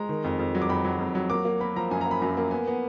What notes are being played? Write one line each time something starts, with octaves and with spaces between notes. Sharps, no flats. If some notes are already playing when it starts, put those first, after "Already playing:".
Already playing: G#3 A#5
D#3
F2
F2
F#3
D6
F2 B5
F#3
F2
F#3
A#3 D6
A#3
A#3 B5
F3 A#5
F#2 G#5
A#5
A#3 B5
F#2 A#5
A#3
B3 G#5
B3